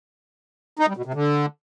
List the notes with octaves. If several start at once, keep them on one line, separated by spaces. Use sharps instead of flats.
D#4
G3
B2
C3
D3